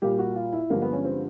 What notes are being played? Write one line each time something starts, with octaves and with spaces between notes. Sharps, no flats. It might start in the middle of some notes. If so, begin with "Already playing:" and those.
A#2 G3 A#3 G4
F#4
F4
E4
G2 D3 F3 G#3 A#3
B3
C#4
C4